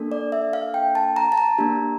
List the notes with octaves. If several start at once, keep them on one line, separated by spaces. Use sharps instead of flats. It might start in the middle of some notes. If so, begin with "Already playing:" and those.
Already playing: A#3 D4 A4
D5
E5
F5
G5
A5
A#5
A5
A#5
A#3 D4 G4